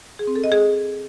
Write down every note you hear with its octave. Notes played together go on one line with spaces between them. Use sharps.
G#4
C4
A4
D#5
G#4